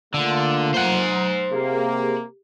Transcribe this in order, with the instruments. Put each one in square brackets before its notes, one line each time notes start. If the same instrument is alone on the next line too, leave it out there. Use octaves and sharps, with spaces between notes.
[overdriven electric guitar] D3 [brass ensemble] A3 A#3 F4 [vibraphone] A5
[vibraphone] F#3 A#5 [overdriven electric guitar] C5 F#5
[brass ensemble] C3 A#3 [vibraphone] G4 G#4